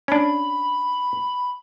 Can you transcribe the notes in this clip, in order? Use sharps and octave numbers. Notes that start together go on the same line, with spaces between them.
C#4 D4 B5